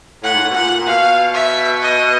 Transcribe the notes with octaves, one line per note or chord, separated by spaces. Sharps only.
A2 F#5
G#2
A2
B2
A#2 F#5
A#2
B2 F5
E5
D#5